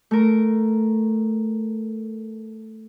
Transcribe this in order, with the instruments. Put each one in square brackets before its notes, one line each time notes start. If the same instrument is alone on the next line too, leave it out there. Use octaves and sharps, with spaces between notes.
[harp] A3 A#4